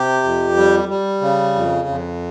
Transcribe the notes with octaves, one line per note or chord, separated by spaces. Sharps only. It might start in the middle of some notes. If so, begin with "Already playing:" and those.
Already playing: C3 G4
F2
G3
G3
C#3
F2
F2